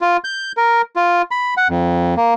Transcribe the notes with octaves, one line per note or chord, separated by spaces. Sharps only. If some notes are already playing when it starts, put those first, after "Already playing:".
F4
G6
A#4
F4
B5
F#5
F2
A#3